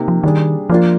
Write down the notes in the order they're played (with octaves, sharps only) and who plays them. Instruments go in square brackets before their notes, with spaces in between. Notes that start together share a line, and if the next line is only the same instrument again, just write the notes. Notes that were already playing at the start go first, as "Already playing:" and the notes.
Already playing: [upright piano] C3 A#3 D#4
[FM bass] F3
[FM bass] D#3 [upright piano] G3 D4 G#4
[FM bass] F3 [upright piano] A#3 D4 F4